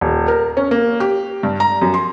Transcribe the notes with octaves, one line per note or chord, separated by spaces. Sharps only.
D#1
A#4
C#4
A#3
G4
G2
A#5
F#2
C6